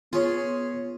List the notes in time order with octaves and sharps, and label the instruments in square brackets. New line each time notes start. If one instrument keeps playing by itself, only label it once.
[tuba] B3 [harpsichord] C#4 G#4 G#5 [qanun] F4